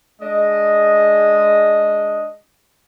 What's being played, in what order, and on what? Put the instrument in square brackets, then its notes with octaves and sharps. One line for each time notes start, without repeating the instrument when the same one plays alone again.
[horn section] G#3 D4 D#5